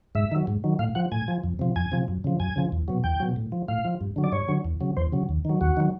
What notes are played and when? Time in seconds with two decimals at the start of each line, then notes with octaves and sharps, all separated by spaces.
0.15 G#2 E5
0.31 D#3 F#3
0.47 G#2
0.64 D#3 F#3
0.79 A2 F5
0.95 F3 F#5
1.12 A2 G#5
1.28 F3
1.44 F2
1.59 C3 F3
1.76 F2 G#5
1.92 C3 F3
2.08 F#2
2.24 C#3 F3
2.40 F#2 G#5
2.56 C#3 F3
2.72 E2
2.88 B2 F#3
3.04 E2 G5
3.20 B2 F#3
3.36 A2
3.52 F3
3.68 A2 F5
3.85 F3
4.01 G2
4.16 D3 F#3
4.24 D5
4.32 G2 C#5
4.48 D3 F#3
4.65 E2
4.81 C#3 F#3
4.97 E2 C5
5.12 C#3 F#3
5.29 D#2
5.45 D#3 F#3
5.61 D#2 F#4
5.77 D#3 F#3